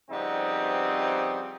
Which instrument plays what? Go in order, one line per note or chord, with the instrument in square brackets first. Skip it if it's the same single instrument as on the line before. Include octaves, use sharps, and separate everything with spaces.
[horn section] C#3 F3 G3 B3 C4 D#4